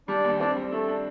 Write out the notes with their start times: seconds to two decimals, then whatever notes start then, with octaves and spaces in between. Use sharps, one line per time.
0.08 G3 D4 D5
0.24 D#2
0.40 C4 D4 D5
0.56 G3
0.72 A3 D4 A4
0.88 D4